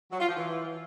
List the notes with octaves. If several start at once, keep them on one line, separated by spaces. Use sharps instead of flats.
F#3
F4
F3
E3